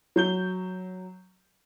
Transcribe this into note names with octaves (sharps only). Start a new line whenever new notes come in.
F#3 G6 G7